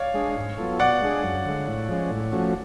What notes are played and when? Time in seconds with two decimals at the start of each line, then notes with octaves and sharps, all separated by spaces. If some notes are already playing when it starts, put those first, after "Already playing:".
Already playing: C#5 D5 F5
0.14 G#3 D4 G#4
0.36 G#2
0.58 F#3 B3 F4 A4
0.79 B2 D5 F#5
1.01 G#3 D4 G#4
1.23 F#2
1.45 D3 G#3
1.67 A2
1.89 F3 G#3 C#4
2.10 A2
2.32 F3 A3 C#4 F#4